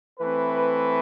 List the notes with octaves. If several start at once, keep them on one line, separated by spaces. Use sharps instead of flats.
E3 A3 C4 B4